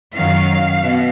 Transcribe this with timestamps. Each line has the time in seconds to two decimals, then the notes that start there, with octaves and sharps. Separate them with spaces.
0.14 F#2 D#3 F#3 F5
0.82 B2